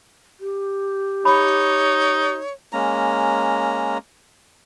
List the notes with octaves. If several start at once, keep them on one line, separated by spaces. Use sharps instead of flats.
G4
D#4 C#5 B5
G#3 A#3 C#4 A#5